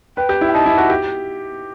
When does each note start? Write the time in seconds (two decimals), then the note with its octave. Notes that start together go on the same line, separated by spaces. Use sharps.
0.17 B4 G5
0.29 G4
0.41 E4
0.48 G5
0.54 D#4 A5
0.66 E4
0.77 F#4
0.90 G4